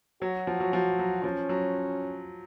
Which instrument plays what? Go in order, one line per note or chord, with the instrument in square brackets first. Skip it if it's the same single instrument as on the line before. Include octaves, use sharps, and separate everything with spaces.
[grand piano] F#3 [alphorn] F#4
[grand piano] F3
F#3
F3
F#3
[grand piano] F3 [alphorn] C#4
[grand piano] F#3